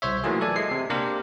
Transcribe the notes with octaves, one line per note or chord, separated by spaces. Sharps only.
C2 C5 C#5 E5
E3 F#3 A3 A#3 F4 G#4
A4 D5 G#5
G#3 E5 C7
C3
A#3 C4 D4 G4 A#4 C5